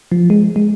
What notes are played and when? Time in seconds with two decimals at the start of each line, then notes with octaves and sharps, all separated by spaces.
0.12 F3
0.30 G#3
0.56 G#3